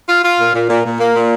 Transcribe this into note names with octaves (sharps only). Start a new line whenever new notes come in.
F4
F4
A#2
A#2
A#2
A#2
A#3
A#2